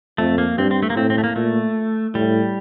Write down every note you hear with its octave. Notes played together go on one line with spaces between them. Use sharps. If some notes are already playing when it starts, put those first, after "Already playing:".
F2 A3
A#3
G2 C4
C4
A3
A#3
A2 C4
C4
A3
A#3
A#2 A3
A2 G3